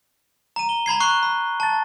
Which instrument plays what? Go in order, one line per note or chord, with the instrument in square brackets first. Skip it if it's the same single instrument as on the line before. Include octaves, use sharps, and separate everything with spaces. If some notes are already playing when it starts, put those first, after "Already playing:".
[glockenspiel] A#5 D#7
G7
A#5 B5 G#6 C7
C#6 F#6 C7 G7
B5
A5 A6